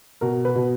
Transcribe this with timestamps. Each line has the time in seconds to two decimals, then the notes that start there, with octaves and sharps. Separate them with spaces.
0.21 B2 A#4
0.45 B4
0.55 B2